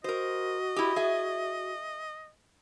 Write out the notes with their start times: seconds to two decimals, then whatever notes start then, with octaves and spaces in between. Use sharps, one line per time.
0.04 F#4 A#4 C5 D#5
0.76 E4 G4
0.96 G#4 E5